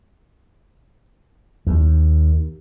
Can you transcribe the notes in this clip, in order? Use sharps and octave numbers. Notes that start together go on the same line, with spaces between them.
D#2